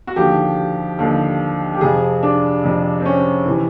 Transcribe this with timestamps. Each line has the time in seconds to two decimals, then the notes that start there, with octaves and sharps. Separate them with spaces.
0.07 F#4
0.16 D#2 D3 F3 G4
0.99 D#2 D3 F3
1.74 G4
1.81 F2 C3 F3 G#4
2.23 D4
2.64 F2 C3 F3
3.00 C4
3.05 C#4
3.46 C3 E3